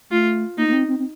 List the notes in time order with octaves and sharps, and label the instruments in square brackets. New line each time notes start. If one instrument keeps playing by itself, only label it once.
[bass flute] A3 [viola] F4
[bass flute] A#3 [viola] D#4
[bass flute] A#3
C4
C4
C4